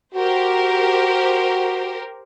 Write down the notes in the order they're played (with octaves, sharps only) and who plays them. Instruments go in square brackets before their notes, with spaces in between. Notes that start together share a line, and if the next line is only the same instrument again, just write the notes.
[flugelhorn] F#4 [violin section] G4 A#4 C5